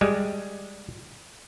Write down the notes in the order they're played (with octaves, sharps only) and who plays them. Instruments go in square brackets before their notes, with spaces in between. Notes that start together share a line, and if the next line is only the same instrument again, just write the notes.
[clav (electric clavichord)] G3 G#3